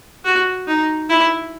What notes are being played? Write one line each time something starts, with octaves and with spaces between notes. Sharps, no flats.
F#4
D#4
E4